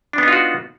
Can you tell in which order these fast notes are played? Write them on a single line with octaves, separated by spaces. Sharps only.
D4 B3 D#4 F4 F#4